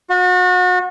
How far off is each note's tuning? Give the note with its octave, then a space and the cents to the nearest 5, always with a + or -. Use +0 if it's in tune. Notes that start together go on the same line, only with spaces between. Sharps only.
F#4 -35